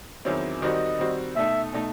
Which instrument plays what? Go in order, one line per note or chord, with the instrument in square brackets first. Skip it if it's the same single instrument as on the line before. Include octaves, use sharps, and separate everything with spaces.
[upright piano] E2 D#3 F#3 C4 E4
[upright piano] D#3 G3 C4 F#4 [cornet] D#5
[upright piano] D#3 G3 C4 F#4
[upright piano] B2 A3 D#4 [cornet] E5
[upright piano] B2 A3 D#4